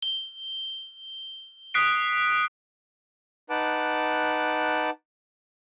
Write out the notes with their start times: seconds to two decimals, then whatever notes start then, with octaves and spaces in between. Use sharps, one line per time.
0.02 G7
1.74 D#6 F#6 B6 C7 D7
3.50 D#4 B4 F#5 A5 D6